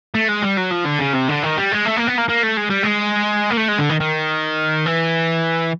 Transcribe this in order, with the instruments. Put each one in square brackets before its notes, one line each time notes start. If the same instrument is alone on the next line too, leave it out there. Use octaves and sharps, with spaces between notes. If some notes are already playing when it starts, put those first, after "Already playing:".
[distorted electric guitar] A3
G#3
G3
F#3
F3
D3
C#3
C3
D3
D#3
G3
G#3
A3
A#3
B3
A#3
A#3
A3
G#3
G3
G#3
A#3
A3
G#3
D3
D#3
D#3
E3